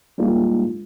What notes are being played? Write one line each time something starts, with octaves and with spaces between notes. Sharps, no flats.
G3 G#3 A#3 D4 D#4 F4